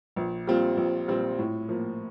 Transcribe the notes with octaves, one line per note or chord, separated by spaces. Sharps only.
A#1
A#2 G3 C4 F4
A#1
A#2 G3 C4 F4
A2
F3 A#3